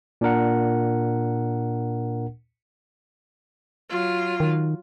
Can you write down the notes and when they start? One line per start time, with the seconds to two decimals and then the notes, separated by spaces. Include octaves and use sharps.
0.21 A#2 D4 A#4 F#5
3.89 F#3 F4
4.40 D#3